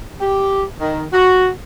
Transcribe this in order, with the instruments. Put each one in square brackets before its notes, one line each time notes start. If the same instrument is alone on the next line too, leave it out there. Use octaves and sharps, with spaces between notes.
[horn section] G4
D#3
F#4